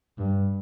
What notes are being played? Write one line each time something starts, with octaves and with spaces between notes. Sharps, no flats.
G2